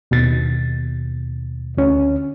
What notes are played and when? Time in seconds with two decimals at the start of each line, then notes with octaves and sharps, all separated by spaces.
0.11 D#2 B2 A6
1.77 D2 C#4